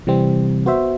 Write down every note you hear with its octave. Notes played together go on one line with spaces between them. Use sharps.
C3 E3 G3 C4
B3 F#4 C5 E5